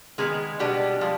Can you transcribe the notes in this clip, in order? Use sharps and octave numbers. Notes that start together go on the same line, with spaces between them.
D#3 G#3 B3 D#4 G#4
B2 G3 G#3 B3 D4 G4
F3 G#3